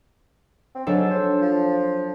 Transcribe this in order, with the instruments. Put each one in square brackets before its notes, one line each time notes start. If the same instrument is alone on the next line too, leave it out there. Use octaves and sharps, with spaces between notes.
[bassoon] C4
[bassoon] G#2 [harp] F#3 D4 A4
[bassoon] C5
F3